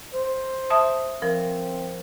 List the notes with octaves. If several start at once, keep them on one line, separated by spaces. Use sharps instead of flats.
C5
E5 A5 D#6
F3 C4 A#4